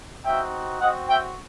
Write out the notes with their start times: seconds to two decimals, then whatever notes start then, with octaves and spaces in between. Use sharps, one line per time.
0.24 C4 D#4 F#4 E5 G5
0.80 C4 F#4 D#5 F#5
1.09 E5 G5